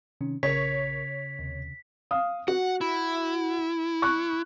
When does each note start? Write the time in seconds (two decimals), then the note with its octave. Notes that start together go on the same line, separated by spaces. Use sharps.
0.21 C3 D#3 C#4
0.43 A#1 C#3 A#4 C#5 B6
1.39 D#2 C3
2.11 F5 D#6
2.48 F#4 F#5
2.81 E4
4.02 C#6 F#6